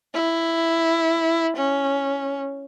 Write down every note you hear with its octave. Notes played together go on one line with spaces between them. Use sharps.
E4
C#4